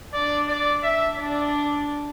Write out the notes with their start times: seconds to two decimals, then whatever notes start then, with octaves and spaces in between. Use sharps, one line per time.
0.13 D4 D5
0.48 D5
0.83 E5
1.17 D4 D5